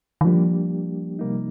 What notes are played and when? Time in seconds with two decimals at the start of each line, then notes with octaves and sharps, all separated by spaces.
0.21 D#3
0.25 F3 G3 A#3 D4 G4
1.19 C3 G3 A#3 D#4